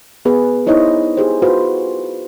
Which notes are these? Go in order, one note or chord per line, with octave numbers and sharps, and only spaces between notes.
B3 G#4 B4
D#4 E4 C5 C#5 D#5
G4 G#4 C5
F4 F#4 B4 C5